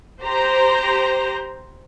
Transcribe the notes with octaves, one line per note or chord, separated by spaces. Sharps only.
G4 C5 A#5